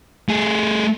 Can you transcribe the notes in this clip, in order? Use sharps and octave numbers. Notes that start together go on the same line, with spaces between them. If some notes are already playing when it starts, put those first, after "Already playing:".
A3 G#4